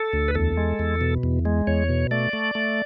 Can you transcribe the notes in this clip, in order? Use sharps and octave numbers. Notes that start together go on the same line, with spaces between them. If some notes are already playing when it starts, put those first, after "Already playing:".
Already playing: A4
D2
B4
E2 A4
G#3
E2
B2
E2
G#3
E2 C#5
B2
A3 D5
A3
A3